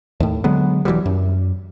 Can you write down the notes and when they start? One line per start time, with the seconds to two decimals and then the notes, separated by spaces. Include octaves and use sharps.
0.20 D#2 A2
0.44 D3 F#3 G#3 B3
0.85 E1 E3 F#3 G3
1.06 F#2